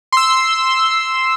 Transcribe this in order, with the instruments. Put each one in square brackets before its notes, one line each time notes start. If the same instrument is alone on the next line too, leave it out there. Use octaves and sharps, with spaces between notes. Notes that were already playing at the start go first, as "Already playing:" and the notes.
[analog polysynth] C6 E6